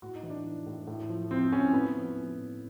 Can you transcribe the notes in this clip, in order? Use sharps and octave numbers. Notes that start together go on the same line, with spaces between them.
A2 F#4
D#4
E3
D4
E3
A2
A2
F3
F3 C4
A2 C#4
A2 B3
F3
F3
A2